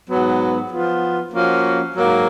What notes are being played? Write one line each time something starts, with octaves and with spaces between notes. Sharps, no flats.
G#2 F#3 B3
F3 B3 F4
F3 A#3 C#4 F#4
G#2 F#3 A#3